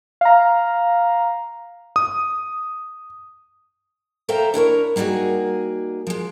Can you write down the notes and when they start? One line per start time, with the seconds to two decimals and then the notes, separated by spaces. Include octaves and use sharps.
0.21 F5 A#5
1.96 D#6
4.29 A4 C5 E5 F5 G5 A#5
4.54 D4 E4 A#4 C#5
4.96 G3 A#3 D#4 F#4 G#4
6.07 F3 G#3